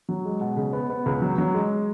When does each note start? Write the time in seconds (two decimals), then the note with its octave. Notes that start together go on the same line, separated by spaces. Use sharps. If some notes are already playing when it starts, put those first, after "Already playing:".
0.09 F#3
0.25 G#3
0.41 B2
0.56 C#3
0.73 B3
0.90 B3
1.06 C#2
1.22 F#3
1.38 F#3
1.54 G#3